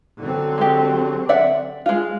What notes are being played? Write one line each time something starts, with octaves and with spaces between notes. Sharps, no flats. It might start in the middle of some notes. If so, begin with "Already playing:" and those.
D3 F#3 C4
G#3 G4
D5 E5 F#5
G#3 F4